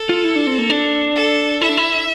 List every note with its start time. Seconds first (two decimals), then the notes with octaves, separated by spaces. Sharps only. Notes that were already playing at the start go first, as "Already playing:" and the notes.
Already playing: A4
0.09 F4
0.24 E4
0.36 D4
0.47 C4
0.58 A#3
0.70 D4
1.15 A4
1.62 E4 E5
1.69 D4
1.77 E4